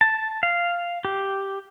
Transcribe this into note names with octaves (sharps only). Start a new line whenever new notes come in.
A5
F5
G4